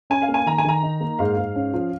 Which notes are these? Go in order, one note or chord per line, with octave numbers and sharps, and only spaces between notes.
C#4 G#5
F5
A#3
G#5
D#3 A#5
G#5
D#3 A#5
D#4
A#3
G#2 F5
G#2
C#4
F3